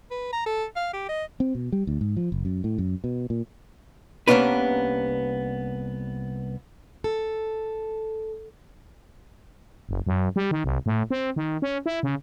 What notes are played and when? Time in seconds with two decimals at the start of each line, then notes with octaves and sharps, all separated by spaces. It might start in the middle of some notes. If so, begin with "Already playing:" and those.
0.11 B4
0.33 A#5
0.46 A4
0.76 F5
0.93 G4
1.09 D#5
1.40 C4
1.55 B2
1.72 G3
1.87 D2
2.01 G#2
2.17 F3
2.32 F#1
2.45 F#2
2.64 A2
2.78 F#2
3.04 B2
3.30 A#2
4.28 C2 A#3 B3 C#4 D4 B4
7.04 A4
9.89 F#1
10.07 F#2
10.36 G3
10.51 D#3
10.64 C2
10.86 A2
11.11 C4
11.36 D#3
11.62 C#4
11.86 E4
12.03 C#3